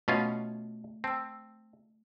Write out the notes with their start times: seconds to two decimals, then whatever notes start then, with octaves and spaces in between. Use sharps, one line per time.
0.08 B2 A3 C#4 F4 E5
1.04 C4 A5 E6